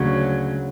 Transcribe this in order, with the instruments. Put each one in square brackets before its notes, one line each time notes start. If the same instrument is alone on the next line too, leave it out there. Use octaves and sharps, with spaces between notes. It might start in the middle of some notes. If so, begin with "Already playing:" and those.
Already playing: [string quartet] D2 C#3 F#3